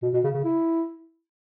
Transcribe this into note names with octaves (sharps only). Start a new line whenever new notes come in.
B2
B2
C#3
C#3
E4